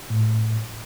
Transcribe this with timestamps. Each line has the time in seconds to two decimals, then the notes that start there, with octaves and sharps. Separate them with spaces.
0.10 A2